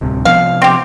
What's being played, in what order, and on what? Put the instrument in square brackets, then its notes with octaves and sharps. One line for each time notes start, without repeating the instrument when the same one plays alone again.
[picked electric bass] D1 C2 C3
[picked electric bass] C3 F3 B3 [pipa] F5
[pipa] C4 G4